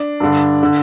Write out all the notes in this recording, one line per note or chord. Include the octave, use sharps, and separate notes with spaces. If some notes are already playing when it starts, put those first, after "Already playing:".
Already playing: D4
G2 D3
D3